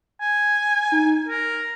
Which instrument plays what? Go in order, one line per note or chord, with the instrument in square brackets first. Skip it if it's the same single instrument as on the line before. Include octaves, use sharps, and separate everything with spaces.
[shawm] G#5
[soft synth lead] D#4
[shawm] A#4